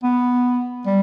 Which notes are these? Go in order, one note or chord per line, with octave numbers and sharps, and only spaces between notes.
B3
G3